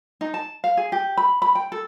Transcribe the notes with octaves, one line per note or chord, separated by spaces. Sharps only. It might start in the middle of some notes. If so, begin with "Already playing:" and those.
D#4
A5
F5
G#4
G4
B5
B5
G5
A4